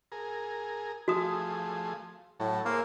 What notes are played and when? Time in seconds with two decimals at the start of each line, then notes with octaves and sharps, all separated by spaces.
0.12 G#4 A#4
1.08 F3 A3 F#4 G#4 D#6
2.40 A2 F#3 A4
2.66 A#3 G#4 C5 E5